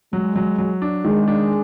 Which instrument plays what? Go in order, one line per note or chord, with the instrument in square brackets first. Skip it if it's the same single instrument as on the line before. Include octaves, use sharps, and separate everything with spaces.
[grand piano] F#3 [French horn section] G#3
[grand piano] F#3
F#3
D4
[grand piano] D#3 [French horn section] G#3
[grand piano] D4